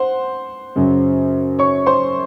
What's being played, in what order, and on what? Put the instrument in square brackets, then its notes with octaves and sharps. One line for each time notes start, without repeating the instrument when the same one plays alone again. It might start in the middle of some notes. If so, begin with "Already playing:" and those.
Already playing: [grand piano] C5 F#5 C6
F#2 C#3 F#3
C#5 C#6
C5 C6